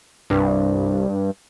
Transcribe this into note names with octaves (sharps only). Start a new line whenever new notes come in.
C2 G2